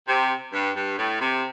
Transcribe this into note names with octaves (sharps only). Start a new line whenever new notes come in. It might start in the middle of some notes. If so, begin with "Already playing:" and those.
C3
G2
G2
A2
C3